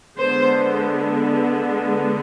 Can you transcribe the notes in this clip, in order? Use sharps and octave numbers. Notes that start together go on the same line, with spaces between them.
D3 G#3 B3 C5